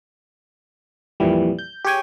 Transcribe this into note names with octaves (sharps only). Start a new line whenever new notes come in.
F2 A#2 E3 G3
G6
G4 G#4 C#5 G5 G#5